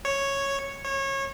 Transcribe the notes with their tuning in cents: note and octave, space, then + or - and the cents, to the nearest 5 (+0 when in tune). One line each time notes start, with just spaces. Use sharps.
C#5 -5
C#5 -25